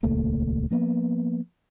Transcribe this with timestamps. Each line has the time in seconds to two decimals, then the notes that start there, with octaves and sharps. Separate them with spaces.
0.03 D#1 C#2 A3 A#3
0.71 F3 A#3 B3